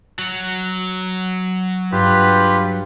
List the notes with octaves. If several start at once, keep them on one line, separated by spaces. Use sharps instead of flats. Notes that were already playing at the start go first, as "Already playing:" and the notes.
F#3
G2 F4 G4 B4